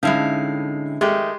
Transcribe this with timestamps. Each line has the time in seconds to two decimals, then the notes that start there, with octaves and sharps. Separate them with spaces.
0.03 A2 D3 G#3 C#4 D#4 E4 F5 C7
1.01 D#3 G#3 A3 G4